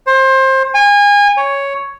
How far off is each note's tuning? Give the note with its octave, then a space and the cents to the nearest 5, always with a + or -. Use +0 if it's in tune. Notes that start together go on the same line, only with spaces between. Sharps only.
C5 +25
G#5 -30
C#5 +5